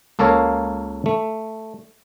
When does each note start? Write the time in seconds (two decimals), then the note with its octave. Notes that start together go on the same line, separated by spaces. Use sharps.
0.19 C#2 A#3 A4 A#4 C#5 F5
1.06 A3